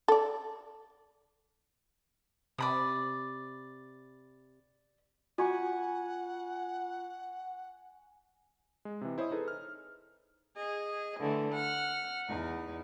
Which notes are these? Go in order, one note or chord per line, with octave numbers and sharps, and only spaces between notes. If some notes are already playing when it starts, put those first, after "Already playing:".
A4 D5
C3 D5 B5 D#6
F4 F#4 F#5 G#5 C#6
G#3
C3 E3
E4 C5 C#5 D#5 D#6
D#4 G#4 A4 B4 C5
F6
G#4 D#5
D3 E3 A3
F#5 F6
E2 D#4